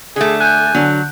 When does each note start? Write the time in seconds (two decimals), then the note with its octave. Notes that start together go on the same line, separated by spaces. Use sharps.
0.16 D3 A3 G#4
0.40 G#5 F#6 G6
0.75 D3 F#3